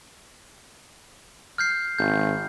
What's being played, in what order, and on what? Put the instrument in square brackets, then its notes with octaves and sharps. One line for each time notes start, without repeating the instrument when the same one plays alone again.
[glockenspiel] F6 G6 C7
[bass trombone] G#1 [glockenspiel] G6